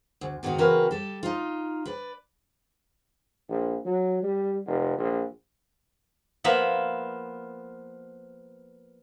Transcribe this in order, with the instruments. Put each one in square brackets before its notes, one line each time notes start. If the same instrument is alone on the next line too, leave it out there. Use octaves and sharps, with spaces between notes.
[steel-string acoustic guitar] D2
G#2 B2 D#3 B3 D#4 F#4
C#3 E3 C4 F#4 A#4 B4
G3 A4
D#4 F4
B4 D5
[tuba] A#1
F#3
G3
F1
A#1
[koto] F3 A#3 B3 E5